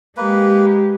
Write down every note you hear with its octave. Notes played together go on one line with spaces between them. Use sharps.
G#3 A#3 G4 B4